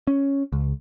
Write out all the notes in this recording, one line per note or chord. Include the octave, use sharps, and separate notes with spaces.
C#4
C#2